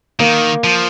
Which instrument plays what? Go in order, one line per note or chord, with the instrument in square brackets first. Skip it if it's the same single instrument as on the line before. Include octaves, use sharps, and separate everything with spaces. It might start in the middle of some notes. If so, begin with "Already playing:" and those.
[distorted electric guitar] D#3 [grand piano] A#3
[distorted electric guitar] F3